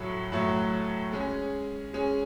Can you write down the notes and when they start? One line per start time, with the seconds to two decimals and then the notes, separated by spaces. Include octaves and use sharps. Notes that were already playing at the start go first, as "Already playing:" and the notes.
Already playing: A2 F#3 A3
0.32 A2 F#3 A3
1.12 G#3 C#4 G#4
1.93 G#3 C#4 G#4